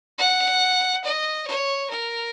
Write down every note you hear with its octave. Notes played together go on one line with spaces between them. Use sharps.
F#5
D#5
C#5
A#4